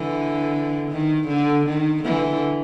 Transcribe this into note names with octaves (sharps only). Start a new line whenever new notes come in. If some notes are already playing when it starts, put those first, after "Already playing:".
Already playing: D3 E3
D#3
D3
D#3
D3 E3